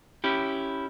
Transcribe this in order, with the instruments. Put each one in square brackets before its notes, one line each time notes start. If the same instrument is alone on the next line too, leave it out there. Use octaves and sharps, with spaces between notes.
[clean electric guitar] C#4 E4 G4